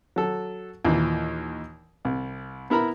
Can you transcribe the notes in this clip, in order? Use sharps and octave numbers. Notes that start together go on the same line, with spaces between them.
F#3 A4
D#2 A#2 E3
C2
B3 E4 A#4 A#5 B5